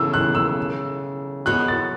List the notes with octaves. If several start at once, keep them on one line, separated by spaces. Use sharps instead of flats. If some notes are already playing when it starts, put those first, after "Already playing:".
Already playing: C#3 E3 A3 E6
F#6
E6
G#3 B3 F#4 C#5 F#6
A6